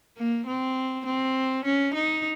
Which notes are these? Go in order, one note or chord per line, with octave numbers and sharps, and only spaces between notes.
A#3
C4
C4
C#4
D#4